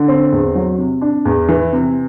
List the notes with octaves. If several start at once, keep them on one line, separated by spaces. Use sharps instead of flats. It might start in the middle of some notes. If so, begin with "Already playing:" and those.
Already playing: D3
C4
E2
F#3
C3
D4
E2
E3
C3